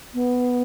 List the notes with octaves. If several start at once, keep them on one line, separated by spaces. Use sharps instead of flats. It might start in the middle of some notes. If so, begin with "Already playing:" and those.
B3